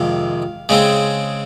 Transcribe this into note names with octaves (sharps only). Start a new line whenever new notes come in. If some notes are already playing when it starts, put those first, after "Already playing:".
Already playing: F2 C3 D#3 G#3 F5
C#3 G#3 C4